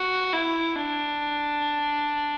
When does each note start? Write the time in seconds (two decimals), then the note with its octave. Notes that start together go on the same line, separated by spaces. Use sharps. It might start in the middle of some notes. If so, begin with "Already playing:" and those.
Already playing: F#4
0.33 E4
0.76 D4